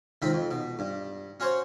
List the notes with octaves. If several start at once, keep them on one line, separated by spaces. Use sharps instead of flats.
C#2 D#3 C4 B5
F2
B2
G2
C#4 F#4 C5 C#5